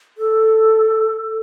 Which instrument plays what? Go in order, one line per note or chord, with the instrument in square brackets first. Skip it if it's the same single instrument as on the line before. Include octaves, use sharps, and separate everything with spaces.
[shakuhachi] A4